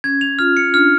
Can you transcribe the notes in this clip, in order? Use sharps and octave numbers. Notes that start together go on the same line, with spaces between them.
C#4 G#6
F7
F4 F6
C#7
D4 F6